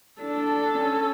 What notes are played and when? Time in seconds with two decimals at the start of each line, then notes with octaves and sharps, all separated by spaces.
0.22 D4 A4
0.78 C#4